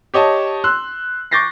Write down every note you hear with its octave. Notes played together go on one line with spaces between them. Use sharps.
G4 C#5 D#5 A5
C6 E6 F#6
C#6 D6 G6 A6 A#6 C7